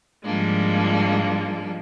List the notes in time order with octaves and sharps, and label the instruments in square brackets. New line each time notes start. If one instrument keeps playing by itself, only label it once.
[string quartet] G#2 F3 G3 G#3 A#3 D4